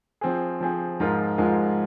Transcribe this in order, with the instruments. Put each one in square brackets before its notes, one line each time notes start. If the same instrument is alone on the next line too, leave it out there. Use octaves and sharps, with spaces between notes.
[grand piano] F3 C4 G#4
F3 C4 G#4
G#2 F3 G#3 F4 A#4
G#2 F3 G#3 F4 A#4